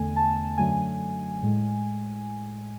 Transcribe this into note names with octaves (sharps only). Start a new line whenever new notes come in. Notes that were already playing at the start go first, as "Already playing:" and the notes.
Already playing: E2 D3 A3 G#5
A5
F#2 D3 F#3 A3 G#5
A2 G#3